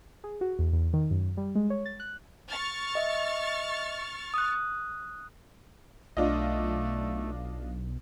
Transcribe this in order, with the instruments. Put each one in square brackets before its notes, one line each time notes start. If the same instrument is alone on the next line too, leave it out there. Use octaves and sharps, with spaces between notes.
[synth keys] G#4
F#4
E2
E2
D#3
F#2
G3
G#3
C#5
A6
F#6
[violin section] C#6 F6 A6
[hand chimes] D#5 E5
D#6 F#6
[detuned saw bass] B1 [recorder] A3 [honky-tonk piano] D4 F4 D#5